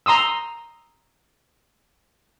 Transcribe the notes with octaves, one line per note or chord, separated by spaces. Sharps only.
A#5 C6 D#6 E6